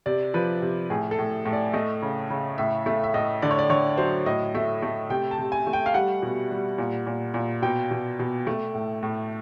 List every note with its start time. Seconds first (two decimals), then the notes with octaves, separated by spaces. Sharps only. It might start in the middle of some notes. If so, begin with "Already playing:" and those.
0.06 C3 D5
0.34 F3 B4
0.62 C3
0.90 A2 G#4
1.11 A4
1.19 A2
1.45 A2
1.53 D5
1.73 A3 D#5
2.02 C#3
2.30 C#3
2.58 A2 E5
2.86 A3 E5
3.04 E5
3.14 A2 D#5
3.42 D3 D5
3.51 C#5
3.59 D5
3.70 D3 C#5
3.98 F#3 C5
4.26 A2 D#5
4.55 A3 E5
4.82 A3
5.10 C3 G5
5.31 A5
5.39 C3
5.52 G#5
5.67 A3
5.73 G5
5.86 F5
5.94 G3 F#5
6.22 B2
6.51 G3
6.78 A#2
7.07 A#2
7.34 A#2
7.62 B2 G5
7.91 B2
8.19 B2
8.47 A3
8.74 A2
9.03 A2